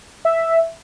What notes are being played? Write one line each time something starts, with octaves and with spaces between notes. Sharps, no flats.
E5